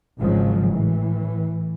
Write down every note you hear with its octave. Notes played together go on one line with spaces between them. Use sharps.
G#1 G#2 C#3 F3 F#3 G#3
A2 E3